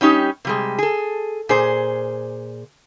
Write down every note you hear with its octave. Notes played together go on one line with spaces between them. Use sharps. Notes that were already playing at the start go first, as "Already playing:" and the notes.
G3 C#4 D#4 G4
C3 G3 G#3
G#4 A4
A#2 G#4 C5